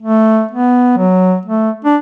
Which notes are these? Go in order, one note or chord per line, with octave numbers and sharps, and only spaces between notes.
A3
B3
F#3
A3
D4